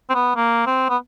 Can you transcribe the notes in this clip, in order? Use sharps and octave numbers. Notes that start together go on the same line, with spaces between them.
C4
B3
A#3
C4
B3